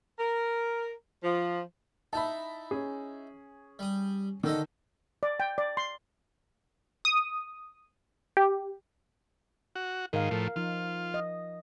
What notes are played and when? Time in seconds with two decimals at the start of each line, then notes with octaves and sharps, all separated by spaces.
0.18 A#4
1.22 F3
2.13 D#4 E4 A5 B5
2.71 C#4 G#4
3.79 G3 D#6
4.44 D3 D#3 A4 D#5
5.23 D5
5.40 G5
5.58 D5
5.77 C6
7.05 D#6
8.37 G4
9.75 F#4
10.13 G#2 D#3 A#4 F5
10.31 A2 F3 A#4
10.56 F3 D#4 F4
11.14 D#5